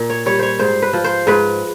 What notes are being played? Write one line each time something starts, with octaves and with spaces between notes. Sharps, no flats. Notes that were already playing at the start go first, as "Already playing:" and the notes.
Already playing: A#2
C#5
G3 C#5
C5 C#5
G#2 C5
B4
F3
C5
G#2 B4